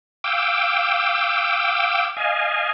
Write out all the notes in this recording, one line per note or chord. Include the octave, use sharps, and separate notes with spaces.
F5 G5 D6 E6
D#5 F5 G#5